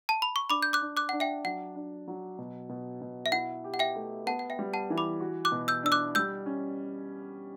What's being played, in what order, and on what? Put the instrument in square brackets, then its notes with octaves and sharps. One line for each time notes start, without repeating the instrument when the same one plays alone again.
[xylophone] A5
B5
C#6
[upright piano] D4 [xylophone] B5 D6
[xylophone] G6
D6 F#6
[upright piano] D4
[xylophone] D6 F#6
[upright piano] D4 [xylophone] F#5
[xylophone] E5 G5
[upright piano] F#3 [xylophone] F#5
[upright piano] D4
F#3
B2
B2
B2
[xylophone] E5
[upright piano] E4 [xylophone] F#5
[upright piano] G4
[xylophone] F#5
E5 G5
[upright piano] A3
[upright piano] B3 [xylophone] F#5 A5
[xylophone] F#5
E5 G5
[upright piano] G3
[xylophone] F#5 A5
[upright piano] E3
[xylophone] B5 D6
[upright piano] F#4
[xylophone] D6 F#6
[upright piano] B2
[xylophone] E6 G6
[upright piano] D4 [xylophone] E6
[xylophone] D6 F#6
[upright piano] G3 [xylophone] E6 G6
[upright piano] C#4